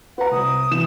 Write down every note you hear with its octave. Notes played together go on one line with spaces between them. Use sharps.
B4 F#5 A#5
C2 D#6
E3 E7